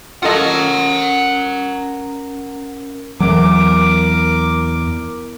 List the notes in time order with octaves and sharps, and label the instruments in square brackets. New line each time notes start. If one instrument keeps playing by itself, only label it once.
[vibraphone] C#4 A#4 [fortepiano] F4 A4 D#5 [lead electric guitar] F#5 A#5
[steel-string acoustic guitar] E2 [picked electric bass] F#3 [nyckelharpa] A#4 D6